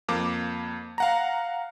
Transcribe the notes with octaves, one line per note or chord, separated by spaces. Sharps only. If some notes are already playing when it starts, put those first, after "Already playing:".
F2 A#3 D6
F5 F#5 A#5